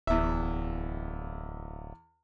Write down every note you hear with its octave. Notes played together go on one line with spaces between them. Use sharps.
D1 E2 E5